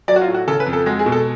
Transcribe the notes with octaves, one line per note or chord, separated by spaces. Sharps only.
F#3 D5
F#4
F4
A2
F#4
C#3 A4
B4
F2
A4
G#3 F#4
G#4
B2
A4